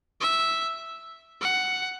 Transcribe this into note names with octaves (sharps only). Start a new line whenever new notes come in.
E5
F#5